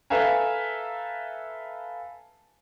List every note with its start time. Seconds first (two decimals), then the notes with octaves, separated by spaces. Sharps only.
0.10 A4 B4 E5 F5 G#5 A#5